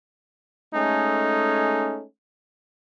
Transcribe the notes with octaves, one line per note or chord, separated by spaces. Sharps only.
G#3 A3 C#4 D#4 G#4 A4